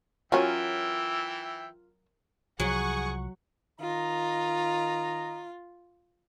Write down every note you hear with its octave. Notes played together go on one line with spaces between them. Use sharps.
E3 F#3 C#4 F4 A#4 E5 G5 G#5
C2 F3 F#3 G#4 F#5 C#6
D#3 F4 D#5 A#5